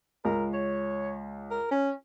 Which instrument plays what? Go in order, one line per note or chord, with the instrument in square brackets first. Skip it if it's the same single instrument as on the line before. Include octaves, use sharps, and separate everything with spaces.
[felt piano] C#2 [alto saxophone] A#4
[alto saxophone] C#5
A#4
C#4